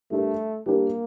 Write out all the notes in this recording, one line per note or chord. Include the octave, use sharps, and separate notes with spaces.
G3 A3 D4 G4 A#4
G3 A#3 D4 G4 A#4